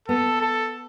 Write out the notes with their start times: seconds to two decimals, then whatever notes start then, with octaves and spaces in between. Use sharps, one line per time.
0.08 B3 A4
0.41 A4